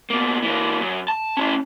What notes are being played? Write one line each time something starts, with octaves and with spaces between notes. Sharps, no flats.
B2 A#3
E3 A#3
F#2
A5
C#4 E4